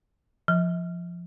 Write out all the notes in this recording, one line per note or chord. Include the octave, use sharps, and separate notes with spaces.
F3